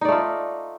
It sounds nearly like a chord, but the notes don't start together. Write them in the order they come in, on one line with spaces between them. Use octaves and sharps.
D#4 D5 A3 F4